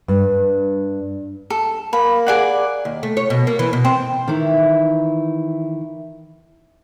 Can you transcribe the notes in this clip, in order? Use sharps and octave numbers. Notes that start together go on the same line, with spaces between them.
G2
A4
A#3 B5
G#4 D5 F#5
D#2
A3
C#5
B2
A#3
E3
B2
C4
D#3 E3 E4